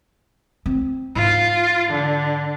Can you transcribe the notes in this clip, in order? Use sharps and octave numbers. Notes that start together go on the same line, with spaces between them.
C4
G#2 F4
D3